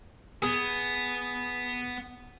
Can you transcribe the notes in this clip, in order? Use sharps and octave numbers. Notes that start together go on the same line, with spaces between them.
B3 G#4